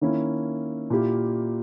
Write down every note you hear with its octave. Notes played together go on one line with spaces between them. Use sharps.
D#3 A#3 C#4 E4
A#2 A#3 E4 G4